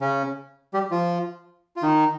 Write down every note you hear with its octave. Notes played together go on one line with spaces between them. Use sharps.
C#3 C#4
G3 G4
F3 F4
F4
D#3 D#4